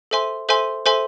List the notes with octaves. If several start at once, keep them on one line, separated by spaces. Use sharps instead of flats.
A4 C5 E5 G#5 C6
A4 C5 E5 G#5 C6
A4 C5 E5 G#5 C6